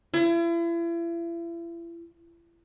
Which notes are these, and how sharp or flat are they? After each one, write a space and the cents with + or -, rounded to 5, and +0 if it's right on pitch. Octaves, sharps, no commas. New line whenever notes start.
E4 +40